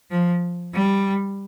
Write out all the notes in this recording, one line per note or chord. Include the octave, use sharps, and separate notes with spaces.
F3
G3